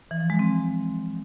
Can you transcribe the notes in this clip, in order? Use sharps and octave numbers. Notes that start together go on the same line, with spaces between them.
E3
F3
G#3
C4